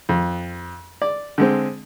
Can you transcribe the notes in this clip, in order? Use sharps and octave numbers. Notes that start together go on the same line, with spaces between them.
F2
D5
D3 G#3 C4